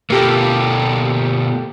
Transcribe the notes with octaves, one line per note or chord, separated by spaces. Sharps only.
B2 A3 A#3 G4 A4